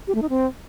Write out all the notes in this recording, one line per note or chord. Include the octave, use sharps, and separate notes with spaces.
G4
A3
D#4
C4